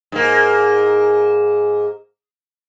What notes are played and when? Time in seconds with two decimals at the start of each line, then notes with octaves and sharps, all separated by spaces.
0.12 G#2 A#3